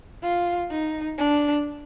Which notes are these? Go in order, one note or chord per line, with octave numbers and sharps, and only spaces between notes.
F4
D#4
D4